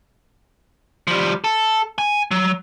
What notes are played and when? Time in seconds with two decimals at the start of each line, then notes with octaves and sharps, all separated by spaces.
1.07 F3 G3
1.44 A4
1.98 G#5
2.31 F#3